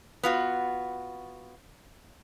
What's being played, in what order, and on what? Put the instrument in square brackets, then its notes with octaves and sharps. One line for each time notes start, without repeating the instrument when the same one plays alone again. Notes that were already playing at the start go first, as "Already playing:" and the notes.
[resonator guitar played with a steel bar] B3 F4 F#4